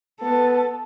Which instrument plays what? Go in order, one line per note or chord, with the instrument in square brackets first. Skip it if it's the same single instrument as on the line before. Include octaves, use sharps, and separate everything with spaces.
[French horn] B3 [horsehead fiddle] A4